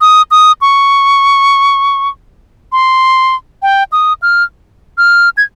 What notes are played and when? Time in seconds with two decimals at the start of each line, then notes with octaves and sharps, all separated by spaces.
0.01 D#6
0.31 D#6
0.61 C#6
2.72 C6
3.62 G5
3.92 D#6
4.22 F6
4.98 F6
5.37 G#6